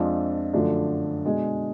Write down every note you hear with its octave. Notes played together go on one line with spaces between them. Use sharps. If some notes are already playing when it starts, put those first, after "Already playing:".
Already playing: F2 F3 G#3 D4 F4
F#2 D3 F3 A3 D4
B2 G#3 D4 G#4